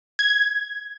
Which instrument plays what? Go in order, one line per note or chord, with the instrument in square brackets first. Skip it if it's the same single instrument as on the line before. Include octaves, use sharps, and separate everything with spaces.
[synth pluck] G#6